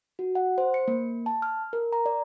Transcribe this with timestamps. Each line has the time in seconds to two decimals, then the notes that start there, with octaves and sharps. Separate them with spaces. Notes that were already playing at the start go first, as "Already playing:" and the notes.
0.19 F#4
0.35 F#5
0.58 C5
0.74 C#7
0.88 A#3
1.26 A5
1.42 F6
1.73 A#4
1.92 A#5
2.06 D5